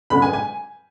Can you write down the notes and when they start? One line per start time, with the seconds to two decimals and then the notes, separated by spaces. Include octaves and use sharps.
0.10 F#2 D3 G#3 B3 B5
0.22 G#5
0.33 G#5